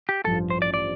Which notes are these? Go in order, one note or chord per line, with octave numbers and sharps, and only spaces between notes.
G4
A1 G2 F3 A4
C5
D5
D5